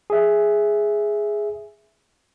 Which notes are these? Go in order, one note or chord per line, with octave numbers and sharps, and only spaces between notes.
G#4 E5